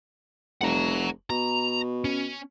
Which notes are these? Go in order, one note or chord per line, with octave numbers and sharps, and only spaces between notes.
F1 F#5 A#5
B2 A#5
C#4